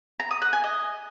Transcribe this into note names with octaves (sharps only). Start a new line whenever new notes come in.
A#5
D#6
F#5
G#5
D#5